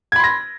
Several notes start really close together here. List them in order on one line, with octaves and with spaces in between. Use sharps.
G#6 B5 C6 A#6